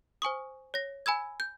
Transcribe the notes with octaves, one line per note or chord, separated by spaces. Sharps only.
C5 G#5 C#6 D#6
C#5 A#6
G#5 B5 E6 G#6
G6